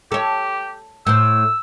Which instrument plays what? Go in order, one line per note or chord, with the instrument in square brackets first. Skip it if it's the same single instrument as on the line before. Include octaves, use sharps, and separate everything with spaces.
[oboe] G4 [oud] A4 C#5
[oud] A2 C5 [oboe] E6